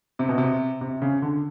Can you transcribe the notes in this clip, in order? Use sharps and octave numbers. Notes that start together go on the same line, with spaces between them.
C3
B2
C3
C3
C#3
D3